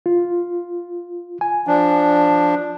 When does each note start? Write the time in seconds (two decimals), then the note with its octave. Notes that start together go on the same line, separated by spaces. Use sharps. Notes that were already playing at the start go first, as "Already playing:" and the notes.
0.06 F4
1.41 G#5
1.67 F3 D4